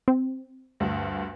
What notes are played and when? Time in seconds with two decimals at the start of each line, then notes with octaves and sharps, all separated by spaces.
0.08 C4
0.80 D2 G2